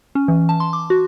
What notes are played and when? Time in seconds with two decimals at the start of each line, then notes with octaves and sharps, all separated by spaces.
0.15 C#4
0.28 E3
0.49 A5
0.60 C6
0.73 D6
0.90 F#4